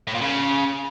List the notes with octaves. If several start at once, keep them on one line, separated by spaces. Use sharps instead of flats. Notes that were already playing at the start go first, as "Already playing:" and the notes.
A2
A#2
C#3